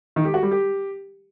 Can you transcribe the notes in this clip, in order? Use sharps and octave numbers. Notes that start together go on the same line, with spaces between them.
D#3
G4
F#4
G3
G4